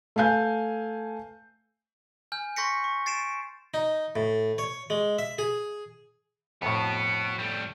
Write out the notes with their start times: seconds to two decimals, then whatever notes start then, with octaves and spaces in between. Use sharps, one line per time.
0.16 A3 B4 F5 G#5 G6
2.32 G#5 F6 G6
2.56 C6 C#6 G6 A#6 B6 C#7
2.84 C#6
3.06 A6 C7 D7 E7
3.74 D#4
4.16 A2
4.58 C#5
4.90 G#3
5.19 E5
5.38 G#4
6.62 F2 A2 B3 F#4
7.39 G3 A3